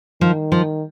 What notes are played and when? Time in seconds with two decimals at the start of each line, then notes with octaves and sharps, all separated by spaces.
0.21 D#3 F3
0.52 F3